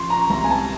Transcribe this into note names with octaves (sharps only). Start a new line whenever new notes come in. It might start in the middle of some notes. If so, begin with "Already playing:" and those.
Already playing: F3 C6 C#6
A#5
C2 A#5
G#5
A5